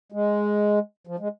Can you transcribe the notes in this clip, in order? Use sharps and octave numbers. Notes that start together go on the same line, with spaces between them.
G#3
F3
G#3